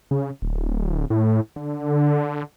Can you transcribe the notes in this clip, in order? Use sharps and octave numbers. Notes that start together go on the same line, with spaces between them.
C#3
D1
A2
D3